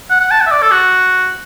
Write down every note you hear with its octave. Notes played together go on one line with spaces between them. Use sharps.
F#5
F#5
A5
F#5
E5
D5
A4
F#4